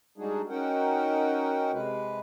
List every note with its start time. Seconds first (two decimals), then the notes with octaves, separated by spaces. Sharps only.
0.18 G3 G#3 D4 D#4 F#4 G#4
0.49 C#4 D#4 F#4 A#4 F#5 G5
1.72 C3 G#3 B4